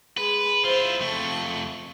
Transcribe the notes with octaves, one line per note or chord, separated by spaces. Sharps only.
G#3 B4
E4 F4 C5
F2 A3 C#6